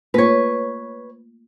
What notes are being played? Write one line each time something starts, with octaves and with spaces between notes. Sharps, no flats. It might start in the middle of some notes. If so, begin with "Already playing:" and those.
A3 A#3 F4 B4 C#5